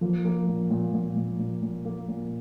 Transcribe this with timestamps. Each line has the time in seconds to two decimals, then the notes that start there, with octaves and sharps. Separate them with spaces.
0.01 F3 A#3
0.25 A#3
0.48 A#2
0.70 A#2
0.93 A#2
1.16 A#2
1.39 A#2
1.62 A#2
1.85 A#3
2.08 A#2